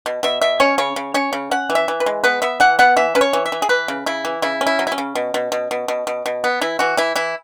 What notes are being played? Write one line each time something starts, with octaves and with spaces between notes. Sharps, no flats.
B2
B2 E5
B2 E5
C#4 C#5
C#3 C#5
C#3
C#4 C#5
C#3
C#4 F#5
E3
E5
E3
B4
G#3
B3 B4
B3 E5
E3 F#5
B3 F#5
E3 E5
C#4 B4
C#5
E3
E5
E3
G#4
E3 B4
C#3
C#3 E4
E3
C#3 E4
C#4
E4
F#3
E4
C#4
C#3
B2
B2
B2
B2
B2
B2
B2
B3
E3 E4
E3 F#4
E3 E4
E3 E4